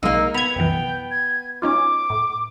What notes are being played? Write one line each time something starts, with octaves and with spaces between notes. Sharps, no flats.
B1 A#2 G#3 A#3 D#4 E6
B3 B5 G#6 F7
C2 F#2 E3 G5
G#6
C#4 D#4 F4 D6
A2